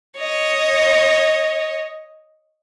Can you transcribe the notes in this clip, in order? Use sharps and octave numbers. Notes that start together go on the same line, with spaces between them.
C#5 D#5